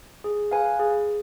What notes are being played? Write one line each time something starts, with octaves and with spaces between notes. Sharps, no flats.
G#4
B4 F5 G#5
G#4